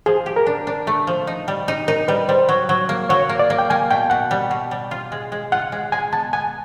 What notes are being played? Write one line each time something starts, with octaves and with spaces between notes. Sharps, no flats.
F3 G#4
G4
A#4
D4
D4
A3
F3
D#4
G3
D#4
D#4 A#4
G3 B4
G3 C5
F#3
F#3
A#3
F#3 C#5
A#3
D5
A#3
G5
A#3 G#5
B2 G5
B2 F#5
G3
B2
G3
F4
G#3
G#3
F4 F#5
G#3
G#3 G#5
B3 A5
B3 G#5